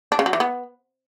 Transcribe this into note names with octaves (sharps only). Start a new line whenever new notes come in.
D4
C#3
F#3
E3
B3